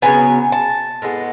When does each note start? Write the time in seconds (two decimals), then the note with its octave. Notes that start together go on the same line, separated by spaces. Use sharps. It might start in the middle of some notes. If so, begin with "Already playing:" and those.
0.02 C#3 F#3 B3 G#5
0.52 A5
1.02 A2 G#3 B3